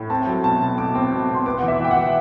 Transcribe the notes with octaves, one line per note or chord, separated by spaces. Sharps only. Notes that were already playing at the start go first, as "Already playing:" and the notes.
Already playing: A2
C4 A5
F#3
B2 A5
B2
B2 D6
C4
B2
B2
C6
B3 D6
E3 F#5
E5
E3 G5
F#5
E3